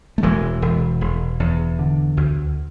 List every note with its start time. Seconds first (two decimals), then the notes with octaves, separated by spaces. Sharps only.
0.18 A3
0.23 E1 E3 G#3
0.62 E1
1.01 E1
1.40 E2
1.79 D3
2.17 D2